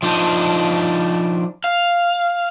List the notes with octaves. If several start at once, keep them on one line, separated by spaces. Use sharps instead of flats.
F3 D4 D#4
F5